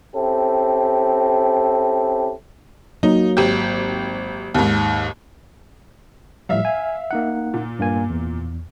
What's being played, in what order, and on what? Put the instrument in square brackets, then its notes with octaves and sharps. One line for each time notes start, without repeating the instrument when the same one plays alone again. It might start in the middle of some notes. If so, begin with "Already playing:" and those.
[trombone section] C4 C#4 E4 G4 A4
[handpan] F#3 A#3 [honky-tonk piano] D#4
[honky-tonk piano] G#1 G4
D#2 G#2
[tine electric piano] A2 F3 G3 [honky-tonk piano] E5 F5
[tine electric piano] G#5
A#3 D#4 F#5
[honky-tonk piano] A#2
[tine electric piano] G2 A#3 G#5
E2